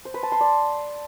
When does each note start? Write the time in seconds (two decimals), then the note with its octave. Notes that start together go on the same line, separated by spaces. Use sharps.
0.05 C5
0.14 B4
0.23 A5
0.32 C6
0.41 D5